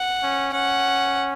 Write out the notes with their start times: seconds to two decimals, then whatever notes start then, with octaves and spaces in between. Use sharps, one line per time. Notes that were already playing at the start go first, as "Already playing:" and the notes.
Already playing: F#5
0.23 C#4
0.53 C#4 F#5